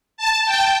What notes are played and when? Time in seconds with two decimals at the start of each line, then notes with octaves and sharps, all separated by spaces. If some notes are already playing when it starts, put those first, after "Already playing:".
0.17 A5
0.46 G5